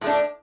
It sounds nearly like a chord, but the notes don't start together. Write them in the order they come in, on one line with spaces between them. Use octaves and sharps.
A2 A3 D4